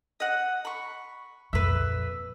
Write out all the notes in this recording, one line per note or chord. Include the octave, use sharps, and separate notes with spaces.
D#5 F#5
B5 C#6
F2 A#2 B4 E5